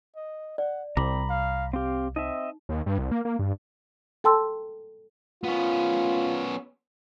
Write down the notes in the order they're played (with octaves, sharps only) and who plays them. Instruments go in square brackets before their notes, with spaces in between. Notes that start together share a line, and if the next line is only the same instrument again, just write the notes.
[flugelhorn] D#5
[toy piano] D5 [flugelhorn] F#5
[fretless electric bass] C2 [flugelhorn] C4 [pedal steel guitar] A#5 B5 [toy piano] D6
[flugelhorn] F5
[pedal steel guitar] C4 G4 [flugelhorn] F5
[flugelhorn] C4 [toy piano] D#4 [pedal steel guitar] D#5 E5
[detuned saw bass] D#2
G2
C2
A#3
A#3
G2
[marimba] A4 G5 A5 C6 E6
[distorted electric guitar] B3 C#4 [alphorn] F4